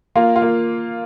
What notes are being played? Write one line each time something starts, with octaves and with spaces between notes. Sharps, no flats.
A#3 F4
F4
A#3